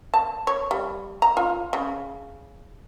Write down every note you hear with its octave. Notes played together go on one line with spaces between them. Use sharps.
A5
C#5
G3
A#5
F4
C#3